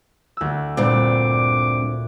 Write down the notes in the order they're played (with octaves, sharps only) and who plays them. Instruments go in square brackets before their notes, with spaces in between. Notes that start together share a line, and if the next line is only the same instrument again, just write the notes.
[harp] D2 E6
[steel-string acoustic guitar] G2 C4 [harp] A#2 D5 [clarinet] D6